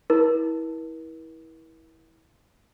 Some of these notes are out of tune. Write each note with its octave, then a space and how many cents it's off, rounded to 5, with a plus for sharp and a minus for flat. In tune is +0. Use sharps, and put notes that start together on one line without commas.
E4 -20 A#4 +45